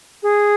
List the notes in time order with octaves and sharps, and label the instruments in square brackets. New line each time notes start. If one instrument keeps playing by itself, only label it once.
[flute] G#4